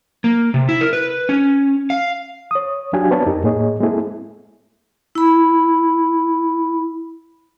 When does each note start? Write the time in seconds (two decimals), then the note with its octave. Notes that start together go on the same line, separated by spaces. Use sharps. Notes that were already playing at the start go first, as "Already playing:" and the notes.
0.24 A#3
0.54 C3
0.69 E4
0.81 A#4
0.93 B4
1.29 C#4
1.90 F5
2.51 C#5 D#6
2.93 F#3 D4 F#4 G4 F5 G#5
3.11 B3 C4 B4 C#5 D5 A5
3.26 F2 D#4 G4 A#4
3.44 A2 A#3 G#4 C#5 D#5
3.80 G#3 A#3 C4 E4 G#4 A4
5.15 E4 B5